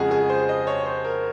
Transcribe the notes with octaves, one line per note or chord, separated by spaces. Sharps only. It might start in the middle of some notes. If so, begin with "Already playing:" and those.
Already playing: F2 C#3 F3 G#3 F#4 G#4
G#4
C5
D#5
C#5
C5
A#4